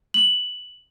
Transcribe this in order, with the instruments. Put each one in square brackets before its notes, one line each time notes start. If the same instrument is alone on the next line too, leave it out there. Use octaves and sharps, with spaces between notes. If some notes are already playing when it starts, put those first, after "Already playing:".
[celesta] F#7